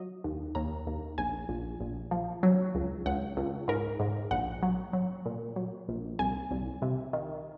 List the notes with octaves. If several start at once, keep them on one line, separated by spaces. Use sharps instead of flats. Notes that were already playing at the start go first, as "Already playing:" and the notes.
Already playing: F#3 D#5
D#2
D#2 A#5
D#2
A#1 G#5
A#1
A#1
F3
F#3
C#2
C#2 F#5
C#2
G#2 A#4
G#2
A#1 F#5
F#3
F#3
A#2
F#3
A#1
C2 G#5
C2
C3
D#3